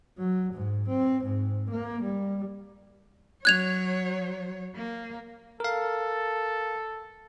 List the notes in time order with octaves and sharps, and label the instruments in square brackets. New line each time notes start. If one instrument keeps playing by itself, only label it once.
[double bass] F#3
G#2
C4
G#2
A#3
G3
[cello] F#3 C#5 [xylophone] F#6 G#6 F7
[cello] A#3
[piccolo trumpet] A4 [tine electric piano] A#4 F5